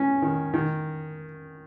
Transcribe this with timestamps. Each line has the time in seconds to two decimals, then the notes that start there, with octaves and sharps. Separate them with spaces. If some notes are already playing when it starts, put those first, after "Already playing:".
Already playing: C#4
0.22 D#3
0.54 D#3